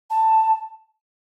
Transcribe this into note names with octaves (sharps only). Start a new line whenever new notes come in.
A5